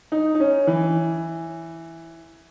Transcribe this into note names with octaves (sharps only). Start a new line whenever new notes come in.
D#4
D#4
C#4
E3